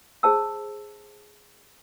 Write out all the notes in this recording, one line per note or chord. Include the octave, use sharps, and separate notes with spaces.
G#4 C5 A5 E6